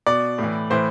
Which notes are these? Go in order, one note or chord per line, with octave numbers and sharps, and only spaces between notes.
B2 D5
A2 E3
A2 E3 C5